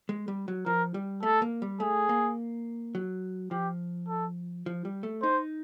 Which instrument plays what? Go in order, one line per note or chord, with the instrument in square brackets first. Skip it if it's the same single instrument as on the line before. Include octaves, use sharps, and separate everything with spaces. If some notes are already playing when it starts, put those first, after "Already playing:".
[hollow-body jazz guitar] G#3
G3
F#3
[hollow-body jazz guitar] F3 [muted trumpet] A#4
[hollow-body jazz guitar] G3
[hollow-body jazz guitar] A3 [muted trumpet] A4
[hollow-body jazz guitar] A#3
G3
[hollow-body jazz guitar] A3 [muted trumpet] G#4
[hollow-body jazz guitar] A#3
F#3
[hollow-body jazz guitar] F3 [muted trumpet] G4
[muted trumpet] A4
[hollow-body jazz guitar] F3
G3
A3
[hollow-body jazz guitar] D#4 [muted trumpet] C5